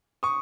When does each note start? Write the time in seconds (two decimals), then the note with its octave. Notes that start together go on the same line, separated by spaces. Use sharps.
0.23 C#6 D#6